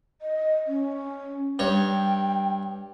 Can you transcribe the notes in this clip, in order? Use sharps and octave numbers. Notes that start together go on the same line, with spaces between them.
D#5
C#4
G2 C#5 G5